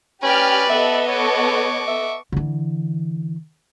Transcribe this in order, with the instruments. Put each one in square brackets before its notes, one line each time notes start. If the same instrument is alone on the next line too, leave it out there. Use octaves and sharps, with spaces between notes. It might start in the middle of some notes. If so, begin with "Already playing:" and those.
[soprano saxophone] C#4 [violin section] G4 G5 F6 [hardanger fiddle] B4 D5
[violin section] B3 A4 D#5 [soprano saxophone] E5
[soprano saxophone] C#5 [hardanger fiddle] C#6 D6
[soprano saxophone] E5
[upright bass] D3 E3